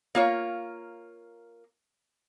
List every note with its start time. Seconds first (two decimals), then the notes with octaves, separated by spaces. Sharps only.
0.15 A#3 F4 C#5